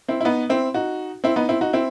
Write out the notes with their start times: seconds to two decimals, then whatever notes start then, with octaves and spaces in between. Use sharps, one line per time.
0.08 C4 E4
0.21 E4
0.25 B3 D#4
0.49 C4 E4
0.74 D#4 F#4
1.24 C4 E4
1.36 B3 D#4
1.49 C4 E4
1.61 D#4 F#4
1.73 C4 E4